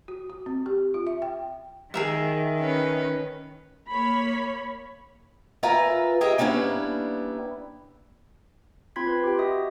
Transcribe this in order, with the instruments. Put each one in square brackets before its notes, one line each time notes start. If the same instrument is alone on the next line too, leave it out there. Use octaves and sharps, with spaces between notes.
[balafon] F#4
F#4
C4
G4
F4
E5
G5
[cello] D#3 [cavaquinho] G#4 A#4 E5
[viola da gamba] C#4 B4
[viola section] A#3 C#5 B5
[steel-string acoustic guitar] F4 A#4 B4 E5 G#5 A#5
G4 G#4 A#4 D#5 E5
G3 A#3 B3 C#4 D4 E4
[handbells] C4 F4 B5 C6 G#6 B6
B4
G4 G5
F#4 D#5 E5 D#6